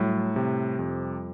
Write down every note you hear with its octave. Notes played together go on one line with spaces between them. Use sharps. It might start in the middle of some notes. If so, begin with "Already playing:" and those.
Already playing: A2 F#3 G3
C3
F2